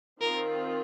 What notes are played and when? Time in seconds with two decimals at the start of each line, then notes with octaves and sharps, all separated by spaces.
0.21 D#3 C4 F4 A#4